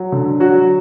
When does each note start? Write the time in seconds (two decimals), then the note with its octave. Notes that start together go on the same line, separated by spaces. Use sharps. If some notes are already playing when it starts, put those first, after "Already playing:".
Already playing: F#3
0.12 D3
0.40 F#3 F#4